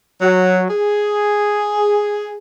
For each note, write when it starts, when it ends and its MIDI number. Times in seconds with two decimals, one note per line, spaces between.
0.21 0.66 54
0.70 2.36 68